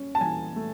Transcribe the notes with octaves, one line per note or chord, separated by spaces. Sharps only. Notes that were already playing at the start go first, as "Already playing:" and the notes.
Already playing: C#4
A5
E3 G#5
A3